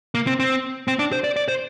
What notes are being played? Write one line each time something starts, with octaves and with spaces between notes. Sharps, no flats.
A#3
C4
C4
C4
D4
C5
D5
D5
C5